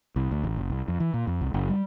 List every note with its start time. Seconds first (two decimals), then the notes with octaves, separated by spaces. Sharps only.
0.16 C2
0.31 D2
0.44 A1
0.57 F#1
0.70 C2
0.88 F2
1.00 E3
1.14 A#2
1.27 F2
1.41 C2
1.54 F#1
1.70 G3